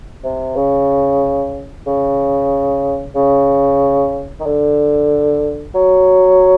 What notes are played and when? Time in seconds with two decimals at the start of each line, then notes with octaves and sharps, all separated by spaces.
0.24 C3
0.56 C#3
1.86 C#3
3.15 C#3
4.40 D#3
4.46 D3
5.74 F#3